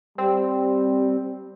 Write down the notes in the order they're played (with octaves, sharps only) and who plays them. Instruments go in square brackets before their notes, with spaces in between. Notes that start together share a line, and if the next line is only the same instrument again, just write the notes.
[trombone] G3 [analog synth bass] C4